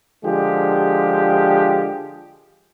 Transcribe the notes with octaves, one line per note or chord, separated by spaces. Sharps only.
D3 F3 G#3 G4